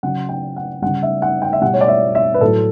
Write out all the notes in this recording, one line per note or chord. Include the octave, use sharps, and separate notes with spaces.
C#3 F#3 F#5
G5
F#5
C#3 G3 F#5
E5
F#5
G5
E5
B2 G3 F#5
C#5
D5
E5
E5
B4
A2 F#3 A4